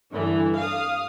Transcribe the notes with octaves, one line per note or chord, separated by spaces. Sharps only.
G2 D3 E3
F5 D#6